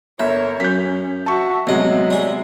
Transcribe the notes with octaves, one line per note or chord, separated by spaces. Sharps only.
G1 A#4 C#5 E5
F#2 C#4 G6 B6
F#4 E5 A5 C#6
A1 C3 F#3 G#3 B3 D#5
G3 G#4